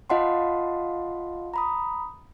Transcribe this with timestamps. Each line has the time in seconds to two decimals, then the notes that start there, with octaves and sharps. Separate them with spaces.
0.10 F4 D#5 F5 F#5 A5 C6
1.54 A#5 B5 D#6